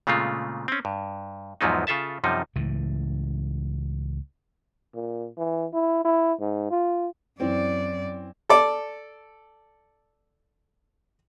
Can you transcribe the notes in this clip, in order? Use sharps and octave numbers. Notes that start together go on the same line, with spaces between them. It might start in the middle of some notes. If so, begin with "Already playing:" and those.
A#2 C#3 G#3 A3 C4 F4
C4 C#4
G2
E2 G#2 F3 F#3 B3 D#4
C#3 F4 A4 E5 A5
F#2 C3 F3 G3 D#4
C#2 A2 E3
A#2
E3
E4
E4
G#2
F4
F#2 E3 C4 D5
A4 D5